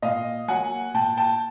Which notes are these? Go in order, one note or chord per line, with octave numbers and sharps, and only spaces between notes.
A#2 D#5 F5
F#3 A#3 F#5 G#5
A#2 G5 A5
G5 A5